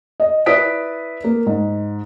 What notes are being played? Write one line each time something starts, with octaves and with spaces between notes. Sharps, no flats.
D#5
E4 B4 D5 D#6 B6 D7
A#3
G#2